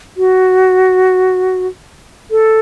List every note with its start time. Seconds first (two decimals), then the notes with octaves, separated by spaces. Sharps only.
0.17 F#4
2.31 A4